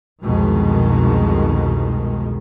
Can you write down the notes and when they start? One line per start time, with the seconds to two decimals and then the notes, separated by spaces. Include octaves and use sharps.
0.24 C2 F2 B2 D#3 G#3